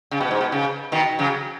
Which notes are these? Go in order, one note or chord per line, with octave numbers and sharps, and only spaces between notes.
C#3
B2
G#2
B2
C#3
B2 D#3
C#3 F#3